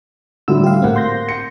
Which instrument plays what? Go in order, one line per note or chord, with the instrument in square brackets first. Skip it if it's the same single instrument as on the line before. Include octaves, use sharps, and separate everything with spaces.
[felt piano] A2 D3 G3 [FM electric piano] F#4 E6
[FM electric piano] G4 F5
[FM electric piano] A2 C4 [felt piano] A#3 F#5
[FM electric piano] C6 G6 A#6
[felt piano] C#7